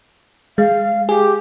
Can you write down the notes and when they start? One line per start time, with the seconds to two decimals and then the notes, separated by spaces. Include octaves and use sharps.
0.58 G#3 F5
1.09 G4 G#4